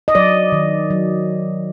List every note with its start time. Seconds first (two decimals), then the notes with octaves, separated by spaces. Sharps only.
0.08 D#5
0.15 F#3 D5
0.52 D#3
0.90 F#3